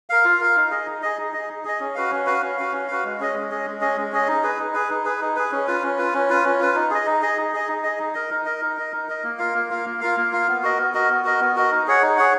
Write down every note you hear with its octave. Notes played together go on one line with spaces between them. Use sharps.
A#4 F5
F4
A#4 F5
D#4
G#4 D#5
D#4
G#4 D#5
D#4
G#4 D#5
D#4
G#4 D#5
C#4
F#4 B4 F5
C#4
F#4 B4 F5
C#4
F#4 B4 F5
C#4
F#4 B4 F5
G#3
C#4 G#4 D#5
G#3
C#4 G#4 D#5
G#3
C#4 G#4 D#5
G#3
C#4 G#4 D#5
D#4
G#4 B4
D#4
G#4 B4
D#4
G#4 B4
D#4
G#4 B4
C#4
F4 B4
C#4
F4 B4
C#4
F4 B4
C#4
F4 B4
D#4
G#4 D#5
D#4
G#4 D#5
D#4
G#4 D#5
D#4
G#4 D#5
D#4
A#4 D#5
D#4
A#4 D#5
D#4
A#4 D#5
D#4
A#4 D#5
A#3
F4 A#4 F5
A#3
F4 A#4 F5
A#3
F4 A#4 F5
A#3
F4 A#4 F5
B3
F#4 A#4 D#5
B3
F#4 A#4 D#5
B3
F#4 A#4 D#5
B3
F#4 A#4 D#5
D#4
G#4 C#5 F#5
D#4
G#4 C#5 F#5